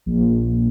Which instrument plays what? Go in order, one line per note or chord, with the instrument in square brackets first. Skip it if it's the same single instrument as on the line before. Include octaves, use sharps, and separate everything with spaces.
[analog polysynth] A#1